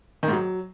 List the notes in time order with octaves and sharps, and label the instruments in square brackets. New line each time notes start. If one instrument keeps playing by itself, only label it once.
[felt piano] D#3
G#2
F#3